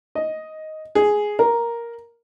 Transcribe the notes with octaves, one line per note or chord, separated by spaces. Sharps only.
D#5
G#4
A#4